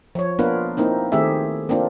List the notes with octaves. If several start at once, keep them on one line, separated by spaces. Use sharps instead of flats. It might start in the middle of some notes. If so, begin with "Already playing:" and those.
F3 C#5
A#3 B3 D4 F4 A#4 B4
A#3 C4 D#4 E4
D#3 A3 C4 G4 G#4 E5
A#3 C4 D4 F4